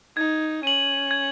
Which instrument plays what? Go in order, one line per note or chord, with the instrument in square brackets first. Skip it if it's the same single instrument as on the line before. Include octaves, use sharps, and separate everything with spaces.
[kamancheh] D#4 [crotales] G#6
[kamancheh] C#4 [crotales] D#7 F#7
[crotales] G#6